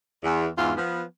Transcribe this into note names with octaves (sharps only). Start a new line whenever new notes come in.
E2
E2 G#2 F4
F3 B3